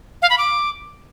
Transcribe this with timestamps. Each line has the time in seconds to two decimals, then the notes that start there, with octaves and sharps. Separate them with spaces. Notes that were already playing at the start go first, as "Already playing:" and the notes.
0.22 F5
0.30 B5
0.38 D6